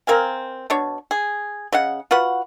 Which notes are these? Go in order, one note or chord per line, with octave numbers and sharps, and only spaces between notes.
C4 A#4 F5 G#5
B2 D4 C#5
G#4
C#3 D#5 F#5
F4 F#4 B4 F#5